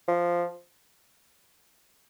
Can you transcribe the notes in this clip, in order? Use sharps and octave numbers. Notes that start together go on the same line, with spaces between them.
F3